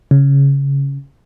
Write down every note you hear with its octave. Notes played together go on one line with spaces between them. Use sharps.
C#3